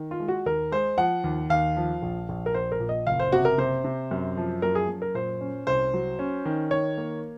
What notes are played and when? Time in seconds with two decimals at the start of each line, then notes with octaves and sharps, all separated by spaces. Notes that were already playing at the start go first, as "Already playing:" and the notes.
Already playing: D#3
0.11 F4
0.20 G#3
0.28 F#4
0.46 D#2 A#4
0.72 G#3 C5
0.97 F3 F#5
1.24 D#2
1.49 D#2 F5
1.77 F3
2.02 A#1
2.29 A#1
2.46 A#4
2.54 A#1 C5
2.72 A#4
2.80 A#2
2.89 D#5
3.07 F#1 F5
3.20 C5
3.32 C3 F#4
3.45 A#4
3.58 C3 C5
3.84 C3
4.11 F#2
4.37 F3
4.62 F#2 A#4
4.75 G#4
4.89 F#2
5.02 A#4
5.15 A#2 C5
5.41 C#4
5.67 C2 C5
5.94 F#3
6.19 C#4
6.45 D#3
6.71 D#3 C#5
6.97 A#3